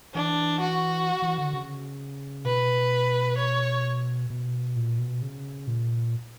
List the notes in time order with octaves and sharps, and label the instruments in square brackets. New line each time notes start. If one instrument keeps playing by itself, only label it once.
[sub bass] E3 [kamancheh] D4
[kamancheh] F#4
[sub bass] E3
D3
C#3
[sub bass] B2 [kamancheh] B4
[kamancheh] C#5
[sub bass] B2
A#2
B2
C#3
A#2